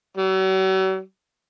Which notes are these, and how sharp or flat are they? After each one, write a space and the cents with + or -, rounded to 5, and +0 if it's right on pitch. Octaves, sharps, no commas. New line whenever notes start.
F#3 +45